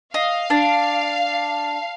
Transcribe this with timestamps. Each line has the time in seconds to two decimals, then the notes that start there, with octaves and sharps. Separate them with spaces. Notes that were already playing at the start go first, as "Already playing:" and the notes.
0.14 D#5 F5
0.50 D4